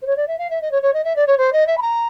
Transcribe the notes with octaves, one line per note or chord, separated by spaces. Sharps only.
C5
C#5
D5
E5
F5
E5
D#5
C#5
C#5
D#5
E5
D5
C#5
C5
D#5
E5
B5
A#5